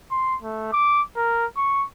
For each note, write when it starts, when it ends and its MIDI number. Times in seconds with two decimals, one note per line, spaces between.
0.11 0.36 84
0.42 0.69 57
0.73 1.02 86
1.16 1.45 70
1.57 1.85 85